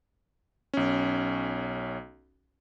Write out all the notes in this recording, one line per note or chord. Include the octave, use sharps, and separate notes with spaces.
B1 C#4